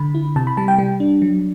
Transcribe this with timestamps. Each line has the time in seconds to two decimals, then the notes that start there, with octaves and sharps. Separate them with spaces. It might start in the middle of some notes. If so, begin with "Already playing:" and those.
Already playing: D3 B5
0.15 E4
0.36 C3 A5
0.47 B5
0.57 G3 A5
0.68 G5
0.78 G3
1.00 D4
1.22 F#3